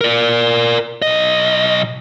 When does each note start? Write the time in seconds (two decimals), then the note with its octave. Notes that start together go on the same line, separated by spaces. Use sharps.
0.01 A#4 D5
1.02 B1 D#5